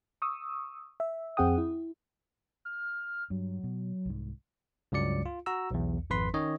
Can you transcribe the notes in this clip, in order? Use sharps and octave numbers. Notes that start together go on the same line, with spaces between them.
C#6 D#6 E6
E5
F2 C4 G#4 F#5 G5 D#6
E4
F6
G2 F#3
B2
C2 G#2
C#2 G2 F#3 D5 C#7
F4
F#4 A#5 E6
B1 E2
G#1 F2 B4 C6 B6
D#3 C#4 D#4 C#5 D#5